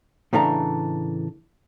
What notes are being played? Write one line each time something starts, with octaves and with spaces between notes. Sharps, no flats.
A2 C#3 E3 A3 D4 A#5